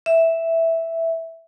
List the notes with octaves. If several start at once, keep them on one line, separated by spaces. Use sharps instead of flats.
E5